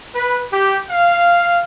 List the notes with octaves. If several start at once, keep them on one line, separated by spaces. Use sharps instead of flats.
B4
G4
F5